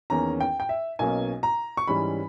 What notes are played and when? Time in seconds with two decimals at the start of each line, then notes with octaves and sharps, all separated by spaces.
0.10 E2 D#3 A#3 C#4 A#5
0.41 G5
0.60 G5
0.69 E5
0.99 B1 B2 A#3 C#4 G#5
1.43 A#5
1.77 C#6
1.87 G#2 E3 G3 C#4 B5